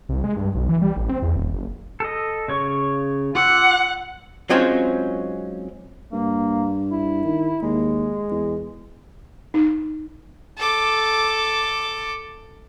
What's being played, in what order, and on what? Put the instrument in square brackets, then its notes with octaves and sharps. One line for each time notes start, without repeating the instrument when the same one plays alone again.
[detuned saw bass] C2
G#3
G2
B1
E3
G3
A1
C4
E2
D#1
F#1
[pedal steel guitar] A4 D#5
C#3 C#5 C#6
[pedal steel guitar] F4 D6 E6 [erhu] F#5
[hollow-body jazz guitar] F#3 G#3 C4 C#4 D#4 F4
[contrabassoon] G2 [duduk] A#3
[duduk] E4
[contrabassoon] D#3
[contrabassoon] D#2 [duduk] G#3
[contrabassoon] E2
[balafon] D#4
[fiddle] A4 D6